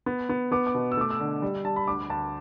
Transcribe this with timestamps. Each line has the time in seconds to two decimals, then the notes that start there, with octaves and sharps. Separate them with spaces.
0.06 B3
0.29 B3
0.52 B3 D6
0.67 D6
0.75 B2
0.92 E6
0.97 A3 D6
1.10 E6
1.20 D3
1.42 G3
1.65 G3 A5
1.76 B5
1.88 D2 D6
2.10 D2 A5